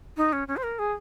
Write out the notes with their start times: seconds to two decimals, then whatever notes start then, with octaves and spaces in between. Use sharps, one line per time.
0.17 D#4
0.33 C#4
0.48 C#4
0.57 C5
0.63 A#4
0.79 G#4